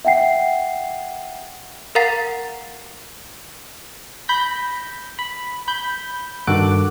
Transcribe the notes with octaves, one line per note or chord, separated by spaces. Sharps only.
E5 F#5 G5 C7
A#4 F5 F#5 A#5 A6 C7
B5 G6 A#6 B6
B5
B5 G6
G2 D#3 F#4 A4 D6 F#6